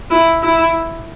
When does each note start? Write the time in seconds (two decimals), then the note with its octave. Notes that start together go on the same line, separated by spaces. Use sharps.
0.11 E4
0.43 E4